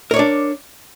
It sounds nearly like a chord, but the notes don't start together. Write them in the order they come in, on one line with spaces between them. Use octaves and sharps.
A#4 C#5 D5 D4